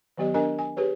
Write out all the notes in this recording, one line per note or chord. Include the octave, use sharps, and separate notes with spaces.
D#3 F#3 B3 G4 D#5
B3 D4 A#4 D#5 G#5
G#5
G4 G#4 B4 C#5